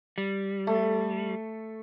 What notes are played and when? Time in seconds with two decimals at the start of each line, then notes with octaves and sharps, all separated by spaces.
0.18 G3
0.67 A3